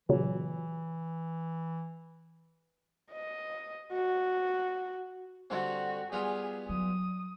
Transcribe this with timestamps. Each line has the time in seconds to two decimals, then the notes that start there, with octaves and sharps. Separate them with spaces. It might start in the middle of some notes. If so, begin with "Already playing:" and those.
0.09 A#2 C#3 E3 F#3
3.12 D#5
3.93 F#4
5.50 D3 G3 C4 F#4
6.12 G3 B3 F4 G#4
6.69 F#3 D#6